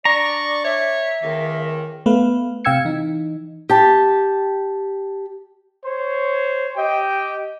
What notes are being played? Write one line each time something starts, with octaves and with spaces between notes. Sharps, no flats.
D4 D5 A#5 C#6
C#5 E5
C#2 D#3 A#3
A3 B3 B4 F5
C3 F5 G5 E6 G#6 C#7
E3 D#4
G4 A5
C5 C#5
G4 D#5 G5